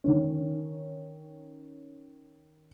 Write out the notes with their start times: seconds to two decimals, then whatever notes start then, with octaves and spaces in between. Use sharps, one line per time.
0.04 D#3 C#4